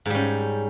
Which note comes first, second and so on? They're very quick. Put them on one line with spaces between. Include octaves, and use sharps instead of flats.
G#2 G3 C#4